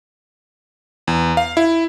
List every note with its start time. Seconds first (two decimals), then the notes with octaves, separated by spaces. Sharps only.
1.07 E2
1.37 F5
1.57 E4